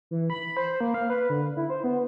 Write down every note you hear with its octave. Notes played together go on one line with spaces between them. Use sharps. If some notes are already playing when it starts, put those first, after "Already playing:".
E3
B5
C5
A#3
F5
B4
D3
E4
C5
B3